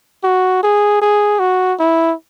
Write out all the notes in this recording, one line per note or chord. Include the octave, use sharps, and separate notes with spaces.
F#4
G#4
G#4
F#4
E4